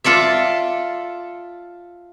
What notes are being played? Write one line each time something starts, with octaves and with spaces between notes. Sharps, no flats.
F4 A4 D5 E5